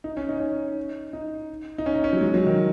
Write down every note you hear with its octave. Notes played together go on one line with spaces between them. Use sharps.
D#4
C#4
D#4
C#4
D#4
D#4
C#4
D#4
C#4
F#3
G#3
F#3
D#3